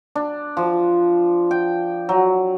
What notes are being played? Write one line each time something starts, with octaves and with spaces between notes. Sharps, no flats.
D4
F3
G5
F#3